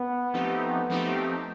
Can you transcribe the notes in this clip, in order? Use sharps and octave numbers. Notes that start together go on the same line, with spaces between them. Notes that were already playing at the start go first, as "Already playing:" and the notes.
Already playing: B3
F3 A3 C4 D#4 G4
F3 A3 C4 D#4 G4